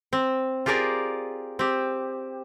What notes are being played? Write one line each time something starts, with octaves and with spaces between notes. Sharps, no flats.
C4
F4 G4 G#4 A#4 D5
C4 G4